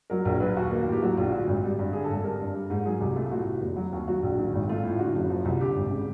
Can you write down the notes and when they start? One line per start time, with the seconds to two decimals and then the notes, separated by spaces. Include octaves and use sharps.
0.10 F#3 A#4
0.25 A#1 A#4
0.40 F#3 B4
0.57 D#2 F#4
0.71 A#3
0.87 A2
0.92 G4
1.03 F#3 F#4
1.17 A#1 F4
1.32 D3 F#4
1.47 G#1
1.64 G3
1.79 G2
1.93 D3 G#4
2.04 A4
2.09 G#1
2.14 A4
2.24 G3 A#4
2.40 G2
2.54 G3
2.70 G#2
2.86 F#3 G#4
3.00 C2 G4
3.15 A3 F4
3.31 A2 F#4
3.47 C3
3.62 F1
3.76 F#3
3.92 D#2
4.08 F#3 F#4
4.23 A#1
4.39 D#3
4.53 G#1
4.69 A3 F4
4.83 A2
4.99 D3 F#4
5.14 F#1
5.30 F3
5.45 C2
5.60 D3 G4
5.76 G#1
5.90 C#3